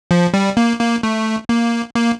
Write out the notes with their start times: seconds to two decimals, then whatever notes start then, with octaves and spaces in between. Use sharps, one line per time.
0.11 F3
0.34 G3
0.57 A#3
0.80 A#3
1.03 A3
1.49 A#3
1.95 A#3